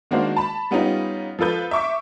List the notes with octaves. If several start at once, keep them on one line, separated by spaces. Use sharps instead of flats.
D#3 G#3 A#3 D4 F#4 C5
A5 B5
G3 B3 C#4 D#4 F4
F3 F4 A4 B4 G6
E5 C#6 D6